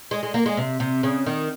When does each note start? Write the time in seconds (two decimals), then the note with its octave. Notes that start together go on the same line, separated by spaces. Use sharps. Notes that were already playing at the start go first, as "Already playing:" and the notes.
0.11 G#3
0.23 G#3
0.34 A#3
0.46 G#3
0.57 C3
0.80 C3
1.03 C#3
1.27 D#3